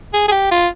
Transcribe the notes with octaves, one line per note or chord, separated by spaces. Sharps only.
G#4
G#4
G4
F4